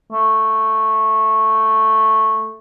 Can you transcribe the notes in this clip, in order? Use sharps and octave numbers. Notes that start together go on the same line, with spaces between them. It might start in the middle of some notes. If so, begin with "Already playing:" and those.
A3